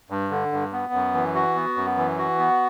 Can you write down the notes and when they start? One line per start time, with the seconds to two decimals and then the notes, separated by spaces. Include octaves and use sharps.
0.10 G2
0.31 D3
0.52 G2
0.73 B3
0.93 F#2
1.14 E3
1.35 F#4
1.56 B3
1.76 F#2
1.97 E3
2.18 F#4
2.39 B3